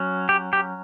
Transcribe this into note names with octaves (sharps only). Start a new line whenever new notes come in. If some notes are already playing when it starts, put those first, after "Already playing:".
Already playing: F#3 C#4
G4
G4